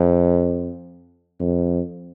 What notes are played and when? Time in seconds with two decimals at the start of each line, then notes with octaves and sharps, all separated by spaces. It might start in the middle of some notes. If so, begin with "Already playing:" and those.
Already playing: F2
1.40 F2